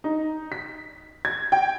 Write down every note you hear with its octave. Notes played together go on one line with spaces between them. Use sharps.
D#4
B6
G#6
G5